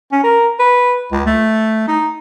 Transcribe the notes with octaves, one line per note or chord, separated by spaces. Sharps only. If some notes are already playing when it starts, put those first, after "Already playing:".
C#4
A#4
B4
C#2
A3
D#4